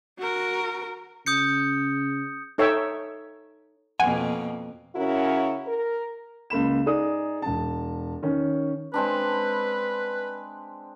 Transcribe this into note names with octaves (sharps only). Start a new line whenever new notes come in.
F#4 A#4
C#3 D#6 G6 C#7
D#4 A4 C#5 E5 G5
F2 B2 A#3 F#5 G#5
C#3 C#4 E4 F#4 A#4
A#4
C#2 A#3 B5 E7
D#4 G#4 D5 D#6
E1 A5
D#3 C#4
G#3 C4 D4 B4